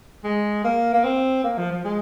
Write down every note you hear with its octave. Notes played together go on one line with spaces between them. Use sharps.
G#3
A#3
A#3
C4
A#3
F3
F3
G#3